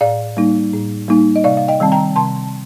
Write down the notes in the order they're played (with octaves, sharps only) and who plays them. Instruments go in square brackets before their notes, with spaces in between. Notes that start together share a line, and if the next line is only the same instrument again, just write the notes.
[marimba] A2 D5 F5
G3 A#3 D#4
A2
G3 A#3 D#4
D#5
C3 D5 F5
F5
D#5 G5
D#3 G3 C4 A5
G5 A#5
C3 A5 C6